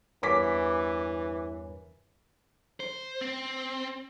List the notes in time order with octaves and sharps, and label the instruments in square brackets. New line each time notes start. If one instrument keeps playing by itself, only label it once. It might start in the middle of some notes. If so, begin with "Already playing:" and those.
[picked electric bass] E2 G2 [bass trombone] E3 [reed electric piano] A#4 C#5 G#5 [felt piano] D6 B6
[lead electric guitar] C5
C4